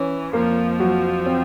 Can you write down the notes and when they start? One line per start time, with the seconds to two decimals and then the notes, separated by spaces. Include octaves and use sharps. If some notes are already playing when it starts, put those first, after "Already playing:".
Already playing: E3 C#4
0.33 F2 F3 A#3
0.80 F#3
1.26 C4